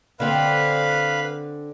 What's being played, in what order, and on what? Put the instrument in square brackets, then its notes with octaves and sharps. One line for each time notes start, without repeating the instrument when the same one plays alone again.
[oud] D3 C4 [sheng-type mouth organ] B4 F5 B5